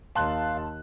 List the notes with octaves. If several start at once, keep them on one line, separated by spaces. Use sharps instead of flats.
D#2 F5 A5 C6 F#6